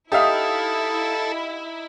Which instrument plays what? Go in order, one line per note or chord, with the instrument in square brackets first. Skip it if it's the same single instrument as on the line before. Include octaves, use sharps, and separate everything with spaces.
[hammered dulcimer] D#4 [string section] E4 [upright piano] G4 E5 F5 [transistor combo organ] A4